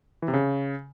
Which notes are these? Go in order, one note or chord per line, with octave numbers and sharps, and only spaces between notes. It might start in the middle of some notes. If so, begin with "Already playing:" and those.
E3
C3
C#3